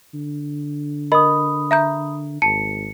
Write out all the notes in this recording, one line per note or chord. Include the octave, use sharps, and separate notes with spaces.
D3
A#4 D#5 B5 D#6
E5 A#5 G6
G#1 A5 C#7